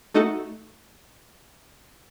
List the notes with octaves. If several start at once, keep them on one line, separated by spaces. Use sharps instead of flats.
A3 D#4 F#4 A4